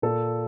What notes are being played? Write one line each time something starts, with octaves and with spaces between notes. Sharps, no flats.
A#2 A4